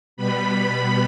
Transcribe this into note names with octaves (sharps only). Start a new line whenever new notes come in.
B2 G3 B3 B5
B5